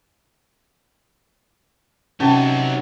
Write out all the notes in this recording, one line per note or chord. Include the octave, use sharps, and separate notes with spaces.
C3 F#3 B3 C#4 D#4 A5